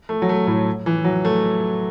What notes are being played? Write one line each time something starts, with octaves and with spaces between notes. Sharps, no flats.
A3
F#3
A3
A2
E3
F#3
A3